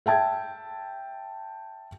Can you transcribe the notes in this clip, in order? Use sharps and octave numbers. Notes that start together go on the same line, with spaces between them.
E5 G5 A5 G#6